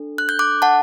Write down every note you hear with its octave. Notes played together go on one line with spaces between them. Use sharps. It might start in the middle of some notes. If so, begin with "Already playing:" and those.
Already playing: D4 A4
F#6
G6
D6 F#6
F#5 A5